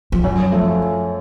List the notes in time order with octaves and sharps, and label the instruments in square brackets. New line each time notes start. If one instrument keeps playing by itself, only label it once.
[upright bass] F3
[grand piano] F#2 [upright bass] F#3
[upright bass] F3 [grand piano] A3